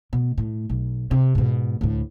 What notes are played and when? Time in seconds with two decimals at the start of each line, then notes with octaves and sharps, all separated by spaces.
0.13 B2
0.38 A2
0.69 B1
1.11 C3
1.35 G#2 B2
1.81 D2 A2